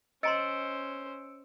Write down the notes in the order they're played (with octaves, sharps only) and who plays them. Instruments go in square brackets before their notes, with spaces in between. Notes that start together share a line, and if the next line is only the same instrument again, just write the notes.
[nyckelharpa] C#4 C5 [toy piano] D#5 A#5 C6 [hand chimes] E6 C#7 D7